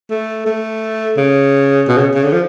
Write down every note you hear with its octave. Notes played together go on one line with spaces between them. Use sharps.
A3
A3
C#3
B2
C#3
C#3
D3
F3